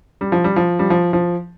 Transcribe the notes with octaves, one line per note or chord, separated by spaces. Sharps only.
G3
F3
G3
F3
G3
F3
F3